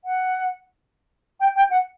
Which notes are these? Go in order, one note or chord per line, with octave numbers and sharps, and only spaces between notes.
F#5
G5
G5
F#5